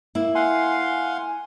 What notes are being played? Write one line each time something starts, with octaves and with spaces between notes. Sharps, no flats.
A#3 E4
F5 F#5 G#5 C6